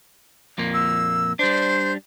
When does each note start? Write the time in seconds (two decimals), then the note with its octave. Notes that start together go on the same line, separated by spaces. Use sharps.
0.58 F2 A#2 A#3
0.74 E6
1.39 G3 D4 C5